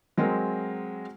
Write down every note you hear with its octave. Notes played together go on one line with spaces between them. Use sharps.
F#3 G#3 C4 G#4 A#4